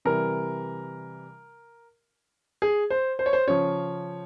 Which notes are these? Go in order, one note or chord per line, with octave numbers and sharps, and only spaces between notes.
C3 E3 G3 A#4
G#4
C5
C5
C#5
C5
C#3 F3 C#5